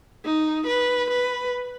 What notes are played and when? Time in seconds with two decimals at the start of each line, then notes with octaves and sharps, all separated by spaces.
0.25 D#4
0.67 B4
1.10 B4